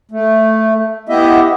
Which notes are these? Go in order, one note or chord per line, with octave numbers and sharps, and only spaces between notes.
A3
B3 E4 G4 D#5 E5